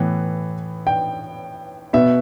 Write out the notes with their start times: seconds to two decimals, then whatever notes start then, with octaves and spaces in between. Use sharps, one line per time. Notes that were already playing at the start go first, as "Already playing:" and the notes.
Already playing: A2 E3 B3
0.87 G5
1.93 B2 B3 E5